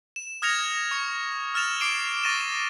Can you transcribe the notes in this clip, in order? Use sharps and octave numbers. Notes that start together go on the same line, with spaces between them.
E7
D#6 F6 G#6 A#6 C#7 F7
C#6 C#7
E6 F6 A6 E7 F7
D6 C7 D7 E7 G7
C#6 D6 A6 A#6 D#7 E7